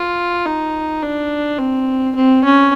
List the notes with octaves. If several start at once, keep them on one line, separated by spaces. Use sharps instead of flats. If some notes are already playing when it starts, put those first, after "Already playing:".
Already playing: F4
D#4
D4
C4
C4
C#4